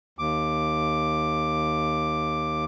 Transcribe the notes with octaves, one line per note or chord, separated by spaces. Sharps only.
D#2 D6